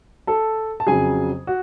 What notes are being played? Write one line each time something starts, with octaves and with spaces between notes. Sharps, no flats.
A4 A5
A5
F2 C#3 F#3 G#4 G#5
F#4